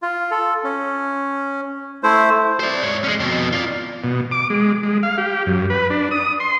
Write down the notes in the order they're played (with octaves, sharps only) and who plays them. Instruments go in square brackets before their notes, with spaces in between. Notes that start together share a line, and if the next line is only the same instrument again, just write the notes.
[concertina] F4
A4
C#4
A3 E4 C5
[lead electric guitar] C5 D5
G#2 C#5
G#3 C#4
F2 B2
F4 D5
[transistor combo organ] B2
D6
G#3
G#3
F5
G4
F#2
B4
D4
D#6
C6